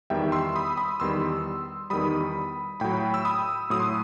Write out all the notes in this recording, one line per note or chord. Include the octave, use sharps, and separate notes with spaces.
E2 D#3 G3 E5 G5
C6 E6
B5 D#6
B5 D#6
E2 D#3 G3 C6 E6
E2 D#3 G3 B5 D#6
A2 F#3 G5 B5
E6
B5 D#6
A2 F#3 D#6
C6